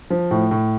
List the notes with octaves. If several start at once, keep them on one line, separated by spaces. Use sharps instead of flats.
F3
A2
A2